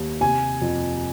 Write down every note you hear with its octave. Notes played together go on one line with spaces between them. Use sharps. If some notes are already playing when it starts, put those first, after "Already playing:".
Already playing: D#2
C3 G#5
F2